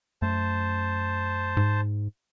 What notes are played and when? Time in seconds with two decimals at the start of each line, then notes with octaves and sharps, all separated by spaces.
0.22 F#2 A3 C5 A5
1.57 G#2